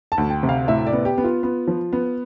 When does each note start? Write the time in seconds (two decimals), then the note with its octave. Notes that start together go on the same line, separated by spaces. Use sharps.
0.12 A5
0.18 D2
0.30 G5
0.43 C3
0.49 F5
0.68 A2 E5
0.87 D5
0.93 B3
1.05 G4
1.18 B3
1.24 F4
1.43 B3
1.67 F3
1.93 B3